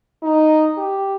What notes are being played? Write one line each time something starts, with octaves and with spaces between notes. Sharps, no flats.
D#4
G4